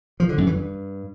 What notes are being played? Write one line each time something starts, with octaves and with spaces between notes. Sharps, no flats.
F3
D3
F#2
E3
G2